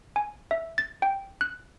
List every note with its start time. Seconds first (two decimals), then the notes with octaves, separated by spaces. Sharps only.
0.16 G#5
0.51 E5
0.78 A6
1.02 G5
1.41 F#6